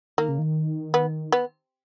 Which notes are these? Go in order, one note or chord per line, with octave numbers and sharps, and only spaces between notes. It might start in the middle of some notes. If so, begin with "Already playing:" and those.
D#3 A#3
C#3
D#3
B3
B3